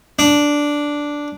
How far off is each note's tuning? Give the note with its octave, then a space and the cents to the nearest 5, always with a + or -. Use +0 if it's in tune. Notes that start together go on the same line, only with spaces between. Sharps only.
D4 -5